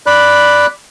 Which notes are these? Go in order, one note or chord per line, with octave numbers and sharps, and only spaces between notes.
D5 B5 F#6